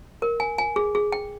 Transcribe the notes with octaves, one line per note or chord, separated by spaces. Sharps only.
A#4
G#5
G#5
G#4
G#4
G5